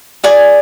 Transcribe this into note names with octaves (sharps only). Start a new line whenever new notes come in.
G#4 D5 G#5